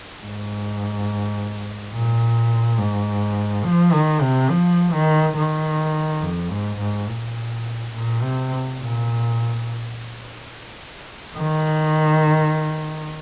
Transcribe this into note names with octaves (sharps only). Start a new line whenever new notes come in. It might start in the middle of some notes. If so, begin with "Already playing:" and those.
G#2
A#2
G#2
F3
D#3
C3
F3
D#3
D#3
F2
G#2
G#2
A#2
A#2
C3
A#2
D#3